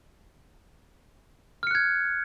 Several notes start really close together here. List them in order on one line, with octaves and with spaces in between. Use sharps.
F6 C#7 F#6 G#6